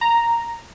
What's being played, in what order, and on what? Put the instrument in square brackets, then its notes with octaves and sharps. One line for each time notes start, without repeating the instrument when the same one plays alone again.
[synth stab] A#5